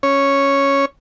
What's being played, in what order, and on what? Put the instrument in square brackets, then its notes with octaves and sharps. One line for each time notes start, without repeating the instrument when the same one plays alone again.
[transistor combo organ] C#4 C#5